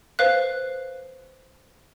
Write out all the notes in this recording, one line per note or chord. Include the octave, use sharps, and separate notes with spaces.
B4 C5 F5 F#6